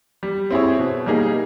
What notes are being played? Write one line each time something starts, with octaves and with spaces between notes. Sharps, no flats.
G3
C4 E4 G#4 C#5
B2
G3 A#3 D#4 G#4